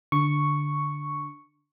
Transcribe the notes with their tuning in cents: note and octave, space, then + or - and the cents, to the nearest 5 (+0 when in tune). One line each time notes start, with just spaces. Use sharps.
D3 +0 C#6 +0